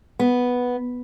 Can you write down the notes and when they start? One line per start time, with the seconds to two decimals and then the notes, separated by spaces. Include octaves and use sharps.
0.19 B3